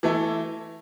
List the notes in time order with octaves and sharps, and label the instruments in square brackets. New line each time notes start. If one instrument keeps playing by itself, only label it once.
[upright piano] E3 A3 E4